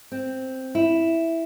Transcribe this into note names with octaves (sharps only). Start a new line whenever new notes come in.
C4
E4